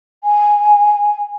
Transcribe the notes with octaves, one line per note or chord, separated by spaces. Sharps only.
G#5